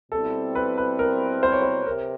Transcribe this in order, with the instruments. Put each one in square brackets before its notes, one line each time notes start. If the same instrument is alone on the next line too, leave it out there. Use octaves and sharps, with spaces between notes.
[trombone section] B2 G3 C4 E4 [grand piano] A4
[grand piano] B4
B4
A#4
C5
C#5
C5
[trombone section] C3 [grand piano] A#4